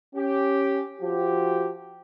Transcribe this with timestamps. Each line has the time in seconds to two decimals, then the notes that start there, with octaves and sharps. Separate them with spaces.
0.15 C#4 G4
1.00 F3 F#4 G4